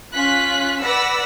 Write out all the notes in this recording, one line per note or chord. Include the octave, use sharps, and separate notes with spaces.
C#4 F4 F#6 B6
B4 D5 F#5 E6 A#6 B6